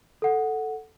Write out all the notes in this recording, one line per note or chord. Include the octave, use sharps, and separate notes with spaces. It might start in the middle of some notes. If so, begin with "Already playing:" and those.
A4 F#5